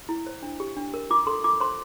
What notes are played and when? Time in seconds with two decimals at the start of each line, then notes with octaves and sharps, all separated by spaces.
0.09 E4
0.27 C5
0.43 D4
0.60 G4
0.77 D4
0.94 A#4
1.10 F4 D6
1.27 A4 C6
1.44 F4 D6
1.60 C5 C6